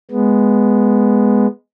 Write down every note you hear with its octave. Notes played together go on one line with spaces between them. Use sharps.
G#3 B3